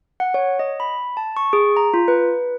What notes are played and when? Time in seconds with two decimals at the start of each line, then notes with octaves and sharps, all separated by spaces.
0.20 F#5
0.34 C#5
0.59 D#5
0.80 B5
1.17 A5
1.37 C#6
1.53 G#4
1.77 A#5
1.94 F4
2.08 B4